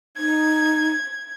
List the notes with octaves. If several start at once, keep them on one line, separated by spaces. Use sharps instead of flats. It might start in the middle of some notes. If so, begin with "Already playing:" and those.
D#4 G#6